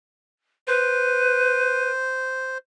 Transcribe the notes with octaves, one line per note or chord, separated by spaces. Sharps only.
B4 C5